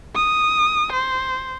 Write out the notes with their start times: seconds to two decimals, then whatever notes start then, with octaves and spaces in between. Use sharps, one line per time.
0.15 D#6
0.93 C5